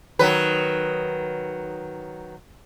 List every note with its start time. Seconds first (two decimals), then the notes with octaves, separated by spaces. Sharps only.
0.19 D#3 F#3 B4